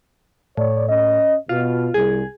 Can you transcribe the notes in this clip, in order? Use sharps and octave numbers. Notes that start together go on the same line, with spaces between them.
A2 C#5 D5
C#4 D#5
B2 F4
C2 G#4